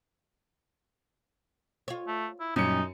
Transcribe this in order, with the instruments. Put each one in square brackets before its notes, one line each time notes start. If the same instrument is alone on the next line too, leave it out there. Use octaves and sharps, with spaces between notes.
[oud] F4 C#5
[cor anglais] A3
E4
[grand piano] F#2 C#7 [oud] A#2 G3 C#4 [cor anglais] D#4